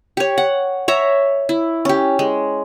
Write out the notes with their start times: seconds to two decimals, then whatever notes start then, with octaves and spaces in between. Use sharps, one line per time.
0.17 G4 C#5
0.38 F#5
0.88 C#5 E5 A#5
1.49 E4
1.85 C#4 G4
2.19 G#3